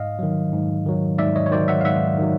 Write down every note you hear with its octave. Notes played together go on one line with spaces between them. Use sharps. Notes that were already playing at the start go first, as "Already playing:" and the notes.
Already playing: G#2 D#5 F5
D#3 F#3
G#2
D#3 F#3
G#2 D5 E5
C#5 D#5
C#5
D#3 F#3 C5 D5
E5 F#5
F5
G#2 E5 F#5
D#3 F#3